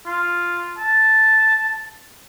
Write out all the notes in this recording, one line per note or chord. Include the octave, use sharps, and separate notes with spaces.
F4
A5